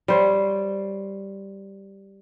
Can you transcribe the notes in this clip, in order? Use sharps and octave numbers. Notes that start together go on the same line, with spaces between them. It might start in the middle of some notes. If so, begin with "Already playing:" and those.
G3 C5 C#5